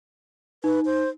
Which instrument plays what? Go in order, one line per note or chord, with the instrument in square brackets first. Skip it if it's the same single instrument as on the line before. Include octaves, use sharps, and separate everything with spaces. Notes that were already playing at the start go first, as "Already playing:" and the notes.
[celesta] D#4 [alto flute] B4
[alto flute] C5